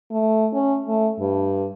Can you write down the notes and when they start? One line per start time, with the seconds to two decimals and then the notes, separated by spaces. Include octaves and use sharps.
0.11 A3
0.53 C#4
0.88 A3
1.19 G2